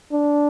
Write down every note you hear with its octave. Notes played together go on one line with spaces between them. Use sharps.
D4